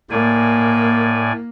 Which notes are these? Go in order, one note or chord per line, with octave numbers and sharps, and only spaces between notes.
A2 A#3 D5 G#5